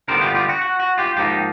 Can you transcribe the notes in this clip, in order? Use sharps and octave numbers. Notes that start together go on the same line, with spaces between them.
D3 G3 B3 A#4 C5
F4 G4
F4 G4
F#4
F#4
F#4
F4 G4
G#2 F3 A#3 D#4 F4 G4